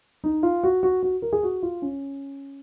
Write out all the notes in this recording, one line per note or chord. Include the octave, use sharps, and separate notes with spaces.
D#4
F4
F#4
F#4
F#4
A#4
G#4
F#4
F4
C#4